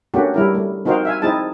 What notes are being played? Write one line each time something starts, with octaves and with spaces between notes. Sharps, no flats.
A3 A#3 C#4 D4 F#4 G4
G3 E4 A#4
A3
C4 D#4 F#4 A#4 C5 F5
E5 F5 G#5
C4 D#4 E4 G#4 A5